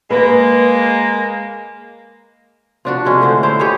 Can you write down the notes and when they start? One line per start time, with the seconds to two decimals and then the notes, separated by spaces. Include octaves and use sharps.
0.11 G#3 A#3 B4
2.85 F3 D4 F#4
3.05 C3 G#3 C#4
3.21 A2 D3 C5
3.43 E4 C5 F5
3.59 G4 G#4 C#5 D#5